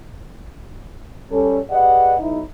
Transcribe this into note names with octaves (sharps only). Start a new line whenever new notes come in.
G3 C#4 A4
G4 G#4 B4 D5 D#5 F#5
B1 D#4 E4